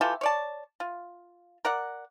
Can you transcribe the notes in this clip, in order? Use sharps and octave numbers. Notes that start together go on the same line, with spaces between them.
E3 F4 G4 A4
C#5 D5 A5
F4
A#4 D5 F#5